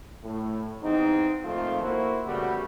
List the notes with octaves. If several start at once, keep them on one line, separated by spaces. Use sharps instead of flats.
A2
E2 G#2 C4 D#4
F2 A#2 D#3 F3 A3 F4
A#3 E4 F#4 C5
C#3 G3 A3 B3 F#4